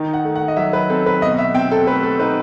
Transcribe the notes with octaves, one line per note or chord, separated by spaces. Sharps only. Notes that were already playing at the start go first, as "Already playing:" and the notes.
Already playing: D#3 D#4
F#5
A3
F#5
D#5
F#3 E5
B4
C4 A4
B4
B2 D#5
E5
C4 G5
A4
A3 B4
A4
D#4 B4